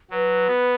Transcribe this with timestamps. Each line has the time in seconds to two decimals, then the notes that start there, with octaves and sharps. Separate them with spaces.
0.11 F#3 B4
0.47 B3